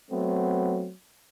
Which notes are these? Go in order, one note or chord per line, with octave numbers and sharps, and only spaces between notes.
F#3 A3 B3 C4